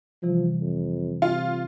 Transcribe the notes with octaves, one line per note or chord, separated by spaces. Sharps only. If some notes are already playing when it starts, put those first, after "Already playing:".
C3 E3 F3 G3
F2
C3 F4